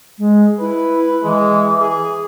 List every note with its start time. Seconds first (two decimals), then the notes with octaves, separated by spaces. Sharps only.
0.18 G#3
0.60 E4 B4
1.23 E3 G#3
1.81 G#4